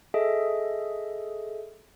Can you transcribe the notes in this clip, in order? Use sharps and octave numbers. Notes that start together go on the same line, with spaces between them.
G#4 A4 D#5 E5